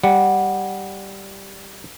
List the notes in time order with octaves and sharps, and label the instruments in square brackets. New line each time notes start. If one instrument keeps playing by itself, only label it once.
[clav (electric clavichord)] G3 [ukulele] F#5